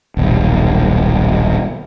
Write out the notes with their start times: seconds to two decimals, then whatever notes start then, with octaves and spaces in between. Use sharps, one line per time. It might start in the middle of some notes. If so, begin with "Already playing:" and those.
0.17 D#1 B1